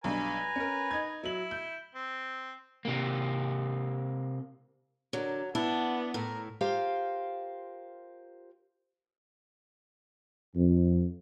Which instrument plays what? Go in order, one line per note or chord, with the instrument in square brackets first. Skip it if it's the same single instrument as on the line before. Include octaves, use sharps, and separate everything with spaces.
[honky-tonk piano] B1 G2 [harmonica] B4 G#5 A#5
[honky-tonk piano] C#4 A#4
D#4 G#6
[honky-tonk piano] F#3 F#7 [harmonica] E4
[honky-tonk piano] G6
[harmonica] C4
[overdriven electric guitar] C3 A#3
[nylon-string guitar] D3 A#4 [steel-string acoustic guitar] F#3
[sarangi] B3 [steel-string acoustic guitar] D4 [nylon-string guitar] E4
[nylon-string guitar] A2 A3 [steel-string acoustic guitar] A#4
[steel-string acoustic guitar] F4 G4 A#4 C5 F5
[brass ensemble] F2